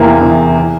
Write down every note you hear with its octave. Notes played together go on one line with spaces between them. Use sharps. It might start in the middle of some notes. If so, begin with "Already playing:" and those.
Already playing: E2 C3 E3 A#3
E2 C3 E3
E3